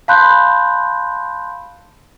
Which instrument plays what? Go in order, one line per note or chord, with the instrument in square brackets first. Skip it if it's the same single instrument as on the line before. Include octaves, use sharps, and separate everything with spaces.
[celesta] F5 A5 B5 C6 F#6 G6